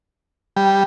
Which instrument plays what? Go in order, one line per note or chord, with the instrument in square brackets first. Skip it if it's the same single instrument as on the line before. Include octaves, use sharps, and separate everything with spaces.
[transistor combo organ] G3